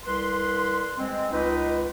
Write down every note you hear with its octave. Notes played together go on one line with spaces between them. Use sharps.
C2 B4 C6
G#3 C4
C#2 G#3 D#4 B4